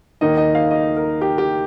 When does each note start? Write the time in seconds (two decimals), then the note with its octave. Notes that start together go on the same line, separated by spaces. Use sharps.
0.21 D#2 D#3 A#3 D#4 D#5
0.37 D#5
0.55 F5
0.71 D#5
0.97 A#4
1.21 G4
1.38 G4